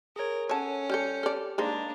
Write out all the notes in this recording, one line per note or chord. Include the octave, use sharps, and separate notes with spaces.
G#4 A#4 C#5
C#4 A4 C#5 F#5 A5
G3 G4 A4 F6 G6 C#7
G4 A4 D5 F6
G#3 A#3 D4 D#4 C5 D5 A#5